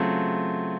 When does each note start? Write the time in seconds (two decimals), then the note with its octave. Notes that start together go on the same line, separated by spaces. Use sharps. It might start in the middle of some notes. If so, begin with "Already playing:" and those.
Already playing: C#3 F#3 A3 C4 F4